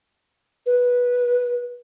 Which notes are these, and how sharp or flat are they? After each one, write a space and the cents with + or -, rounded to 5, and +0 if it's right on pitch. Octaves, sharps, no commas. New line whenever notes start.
B4 -15